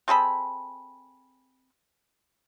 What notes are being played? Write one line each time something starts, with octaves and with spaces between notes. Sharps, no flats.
C4 G#4 A4 B5